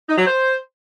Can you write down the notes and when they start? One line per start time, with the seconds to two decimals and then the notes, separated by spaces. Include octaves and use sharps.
0.09 D#4
0.18 F#3
0.26 C5